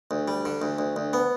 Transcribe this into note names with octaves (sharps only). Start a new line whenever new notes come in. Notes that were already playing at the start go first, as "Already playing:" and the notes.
D2
G3
D3
D2
D2
D2
B3